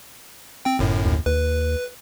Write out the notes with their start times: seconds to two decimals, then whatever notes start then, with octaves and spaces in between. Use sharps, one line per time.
0.65 C4 G5
0.79 G1 F#2 A2
1.05 D#2
1.26 D#2 B4